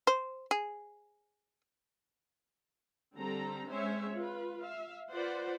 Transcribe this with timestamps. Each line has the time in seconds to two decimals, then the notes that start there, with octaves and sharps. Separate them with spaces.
0.07 C5
0.51 G#4
3.16 D3 G3 C4 A4 A#5
3.70 G#3 C4 C#4 C5 C#5 E5
4.15 F4 B4
4.61 E5 F5
5.11 F4 B4 C5 D5 F#5